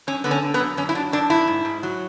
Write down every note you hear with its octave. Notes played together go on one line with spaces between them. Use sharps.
F#2 C#4
D3 B3
C#4
D3
B3
F#2
F#2 C#4
E4
F#3 D4
F#2 D4
F#2 E4
G#2
G#2
F#3